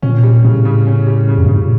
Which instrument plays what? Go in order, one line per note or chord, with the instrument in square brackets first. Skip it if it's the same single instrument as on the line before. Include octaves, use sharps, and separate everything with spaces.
[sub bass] A#2 [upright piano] C#4
[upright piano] G3
[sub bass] A2 [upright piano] C#3
[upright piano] C#3
C#4
G3
C#3
[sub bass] F2
[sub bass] G2 [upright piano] C#3
[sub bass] A2
A#2